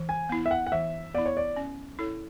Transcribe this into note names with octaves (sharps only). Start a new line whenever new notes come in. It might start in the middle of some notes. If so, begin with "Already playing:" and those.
Already playing: E3
G#5
B3 E4
E5
F#5
F#5
E3 E5
B3 E4 D5
C#5
D5
C#4
E4 A4 C#5